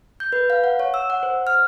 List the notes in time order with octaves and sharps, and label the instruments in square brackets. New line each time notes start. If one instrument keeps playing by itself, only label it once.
[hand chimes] G6
B4
F5
F#5
C#5
E6
F#5
C5
F6